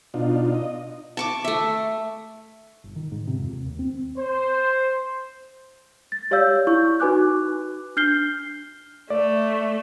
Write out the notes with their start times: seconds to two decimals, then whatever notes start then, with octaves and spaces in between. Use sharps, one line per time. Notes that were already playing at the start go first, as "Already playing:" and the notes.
0.14 B2 D4 D#4 F4
0.54 D#5
1.17 A5 C#6 D6
1.44 A3 E5
2.84 G1
2.96 D#3
3.12 G#2
3.27 C3
3.39 F2
3.53 D#2
3.66 D#2
3.79 C4
4.16 C5
6.12 A6
6.31 G4 C#5 D5 F5 E6 G6
6.67 E4 C#6 G6
7.00 D#4 F#4 B4 G#5 D6 F#6
7.96 D4 F6 G6 C7 G7
9.10 A3 D5